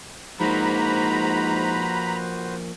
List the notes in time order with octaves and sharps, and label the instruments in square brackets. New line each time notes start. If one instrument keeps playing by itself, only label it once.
[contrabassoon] G#2 [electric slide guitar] F3 A#3 [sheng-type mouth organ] F#4 B4 C5 [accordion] A#5 B5